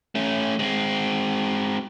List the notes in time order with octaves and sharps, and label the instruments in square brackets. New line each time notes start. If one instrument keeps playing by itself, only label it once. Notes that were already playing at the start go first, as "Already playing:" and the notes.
[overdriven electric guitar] A3 C#4
G#3 C4